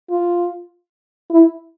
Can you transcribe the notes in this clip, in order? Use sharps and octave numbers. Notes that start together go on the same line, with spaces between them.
F4
E4